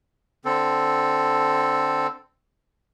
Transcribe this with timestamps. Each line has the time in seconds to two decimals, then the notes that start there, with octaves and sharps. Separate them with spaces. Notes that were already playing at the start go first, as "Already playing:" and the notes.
0.45 D3 C4 A4